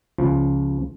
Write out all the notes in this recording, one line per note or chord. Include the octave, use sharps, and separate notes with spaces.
C#2 F3